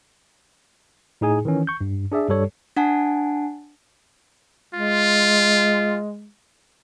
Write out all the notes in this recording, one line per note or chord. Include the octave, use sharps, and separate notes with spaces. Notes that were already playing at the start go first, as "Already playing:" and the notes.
A2 D#4 G#4 G#5
D#3 E3 C#4
C#6 G6
G2
D4 G#4 D5 E5
G2 G3 A4 C#5
D4 F#5 G#5 A5
G#3 F4